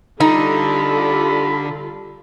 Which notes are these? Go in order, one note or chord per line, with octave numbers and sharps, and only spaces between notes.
D3 G3 D#4 F4 A4 B5